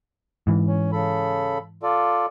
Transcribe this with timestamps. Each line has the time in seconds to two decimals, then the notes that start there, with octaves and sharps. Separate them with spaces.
0.47 G#2 E3
0.67 C#4
0.92 C#3 A4 B5
1.83 F4 A4 D5